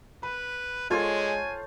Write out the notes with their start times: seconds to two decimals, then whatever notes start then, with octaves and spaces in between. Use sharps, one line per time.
0.23 B4 B5
0.90 G#3 F4 A4 C5 C#5 G#5